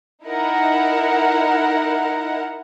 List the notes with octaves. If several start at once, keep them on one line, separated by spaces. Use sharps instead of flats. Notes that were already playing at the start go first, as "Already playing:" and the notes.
D#4 E4 A#4 F#5